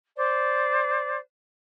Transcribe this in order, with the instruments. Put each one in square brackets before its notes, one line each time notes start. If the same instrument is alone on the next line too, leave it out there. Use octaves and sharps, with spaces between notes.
[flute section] C5 D5